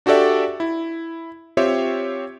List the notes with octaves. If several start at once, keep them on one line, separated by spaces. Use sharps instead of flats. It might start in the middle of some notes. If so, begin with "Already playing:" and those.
D4 F#4 G4 A4 D5 E5
E4
C4 F4 G4 C#5 E5